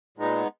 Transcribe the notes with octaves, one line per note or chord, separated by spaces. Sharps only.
A#2 G#3 B3 D#4